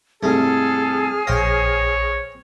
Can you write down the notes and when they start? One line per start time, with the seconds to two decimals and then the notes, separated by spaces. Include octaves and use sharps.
0.23 C2 G#2 A3 G#4 A4 F6
1.27 A#1 C5 C#5 F5 G5 A#6